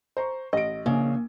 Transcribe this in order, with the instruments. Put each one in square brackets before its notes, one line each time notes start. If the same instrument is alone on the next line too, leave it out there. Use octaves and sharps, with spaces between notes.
[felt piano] C5 A#5 C#6
[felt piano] A1 D7 [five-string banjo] D#5
[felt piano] A#1 [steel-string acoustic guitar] C#3 [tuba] A#3